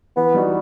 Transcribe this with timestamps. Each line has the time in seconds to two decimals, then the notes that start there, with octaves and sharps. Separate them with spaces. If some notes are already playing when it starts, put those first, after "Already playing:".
0.16 E3 B3
0.34 G3 D#4 F#4